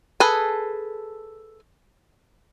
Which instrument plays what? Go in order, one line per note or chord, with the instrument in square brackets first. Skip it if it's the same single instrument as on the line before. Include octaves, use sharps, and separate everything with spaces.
[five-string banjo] G#4 A4 B4 G#5